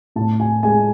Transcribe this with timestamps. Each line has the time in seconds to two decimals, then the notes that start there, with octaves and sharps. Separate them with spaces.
0.16 A2 A5
0.40 G#5
0.63 G#3 G#5